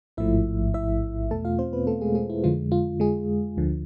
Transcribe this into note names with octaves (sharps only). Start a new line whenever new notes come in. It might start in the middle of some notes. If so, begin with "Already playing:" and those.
A1 G#2 F3 A3 E4 E5
E4 E5
E2 B2 A3 A4 A5
F4 F5
C4 C5
B3 B4
A3 A4
G#3 G#4
G#3 G#4
E4
F2 D3 G#3 F4
F4
G#3 G#4
D2 D3 F3